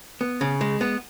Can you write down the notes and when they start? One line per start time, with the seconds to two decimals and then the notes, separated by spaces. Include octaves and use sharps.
0.21 B3
0.41 C#3
0.61 G#3
0.81 B3